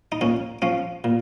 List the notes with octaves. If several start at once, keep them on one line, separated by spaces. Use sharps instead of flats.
D#4
A#2 C#4
F3 C#4
A#2